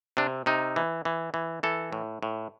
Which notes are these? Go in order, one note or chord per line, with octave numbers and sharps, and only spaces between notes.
C3 D4
C3 D#4
E3
E3
E3
E3 A4
A2
A2